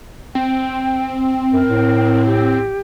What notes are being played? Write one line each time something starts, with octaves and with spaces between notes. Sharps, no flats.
C4 G5
F#2 A#4
A2
G4